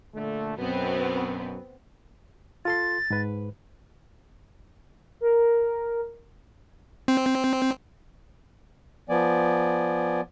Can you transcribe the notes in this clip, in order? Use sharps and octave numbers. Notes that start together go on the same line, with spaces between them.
A#2 D3 A3
F#2 B2 B3 C4
F4 A4 C6 A6
G#2 B4
A#4
C4
F3 B3 D5 G#5